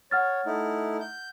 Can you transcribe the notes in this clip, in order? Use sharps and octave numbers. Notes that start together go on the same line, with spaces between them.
C#5 F#5 F6 A6
A3 D#4 E4
G6